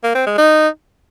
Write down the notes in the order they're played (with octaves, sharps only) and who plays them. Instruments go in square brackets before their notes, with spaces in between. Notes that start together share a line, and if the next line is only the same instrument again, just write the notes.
[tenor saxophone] A#3
C4
G#3
D#4